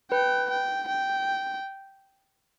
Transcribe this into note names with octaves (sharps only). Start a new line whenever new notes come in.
B4 G5
G5
G5